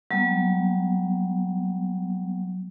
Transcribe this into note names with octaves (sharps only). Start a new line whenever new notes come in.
F#3 G3 A#3 B3